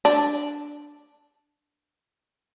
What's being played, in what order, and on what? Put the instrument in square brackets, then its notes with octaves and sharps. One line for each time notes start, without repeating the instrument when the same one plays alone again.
[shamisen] D4